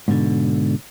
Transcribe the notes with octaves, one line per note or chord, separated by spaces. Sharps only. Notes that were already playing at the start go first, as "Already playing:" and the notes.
G#2 B2 D3